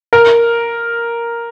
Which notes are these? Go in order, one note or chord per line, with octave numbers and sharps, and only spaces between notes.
A#4